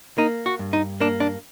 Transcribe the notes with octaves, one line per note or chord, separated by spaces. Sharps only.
A#3 D#4
F#4
G2
D#4
A#3 D4
D4